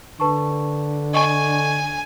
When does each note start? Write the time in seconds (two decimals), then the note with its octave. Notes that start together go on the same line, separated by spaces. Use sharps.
0.20 D3 B4 A5 C#6
1.14 D#5 G#5 C#6